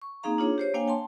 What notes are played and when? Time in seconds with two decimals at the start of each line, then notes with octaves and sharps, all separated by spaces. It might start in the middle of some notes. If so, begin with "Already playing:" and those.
0.02 C#6
0.23 A#3 C4 D#4 G#4 F5 A#5
0.38 D4 F4 G#4 C#5
0.58 G4 C5 C#5
0.74 A#3 D4 C#5 F5 G5 G#5
0.88 G5 A5 C6